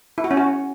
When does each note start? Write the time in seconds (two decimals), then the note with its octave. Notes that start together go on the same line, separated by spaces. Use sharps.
0.18 E4
0.24 F#4
0.31 C#4
0.37 F#4